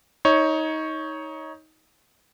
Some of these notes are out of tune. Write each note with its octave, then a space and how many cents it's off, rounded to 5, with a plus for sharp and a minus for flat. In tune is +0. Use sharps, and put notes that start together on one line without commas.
D#4 +20 C#5 +0